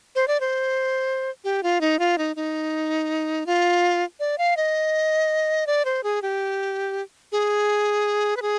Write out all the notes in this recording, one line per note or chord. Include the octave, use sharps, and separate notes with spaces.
C5
D5
C5
G4
F4
D#4
F4
D#4
D#4
F4
D5
F5
D#5
D5
C5
G#4
G4
G#4
B4
G#4